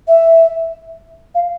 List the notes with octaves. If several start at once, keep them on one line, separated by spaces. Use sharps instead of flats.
E5
F5